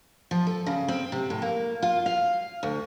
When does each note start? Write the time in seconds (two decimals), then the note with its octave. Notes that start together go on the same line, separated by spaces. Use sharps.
0.31 F3
0.47 A4
0.66 C#3
0.88 C4
1.12 C3
1.30 A2
1.42 A#3
1.82 F4
2.06 F5
2.63 D2